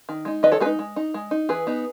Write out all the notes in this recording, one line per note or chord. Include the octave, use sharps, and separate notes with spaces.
D#3
G#3 D#4
D#3 B4 D#5
A4 C#5
G#3 G#4 B4
D#4
G#3
D#4
G#3
D#4
E3 G#4 B4
B3 D#4